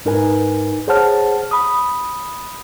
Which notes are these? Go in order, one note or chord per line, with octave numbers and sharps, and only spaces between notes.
G#2 D#4 A#4 B4 G#5
G#4 C5 C#5 F#5 A5 F6
B5 D#6